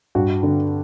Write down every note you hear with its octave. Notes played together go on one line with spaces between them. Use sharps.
G2 F#4
D3